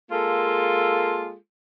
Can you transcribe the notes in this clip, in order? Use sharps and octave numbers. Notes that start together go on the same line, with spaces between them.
G#3 A#3 F4 A4